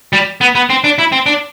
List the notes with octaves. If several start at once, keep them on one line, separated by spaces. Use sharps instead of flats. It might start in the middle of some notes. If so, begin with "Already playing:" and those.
G3
B3
B3
C4
D4
E4
C4
D4